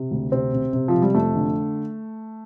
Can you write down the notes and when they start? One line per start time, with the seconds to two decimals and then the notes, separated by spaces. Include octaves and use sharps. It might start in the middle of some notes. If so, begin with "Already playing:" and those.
Already playing: C3
0.11 D2
0.32 C3 C4
0.53 C3
0.73 C3
0.88 F3
0.94 C3
1.02 G3
1.14 F2 A3
1.35 D3